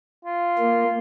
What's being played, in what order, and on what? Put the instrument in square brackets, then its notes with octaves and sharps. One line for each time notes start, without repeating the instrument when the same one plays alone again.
[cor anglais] F4
[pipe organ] A#3